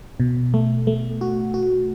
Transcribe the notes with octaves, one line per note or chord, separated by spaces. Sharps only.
B2
A3
A3
F#4
F#4